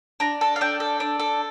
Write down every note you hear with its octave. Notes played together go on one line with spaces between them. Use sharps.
D4 A#5
A4 A5
F5
D4 G5
A4
D4
A4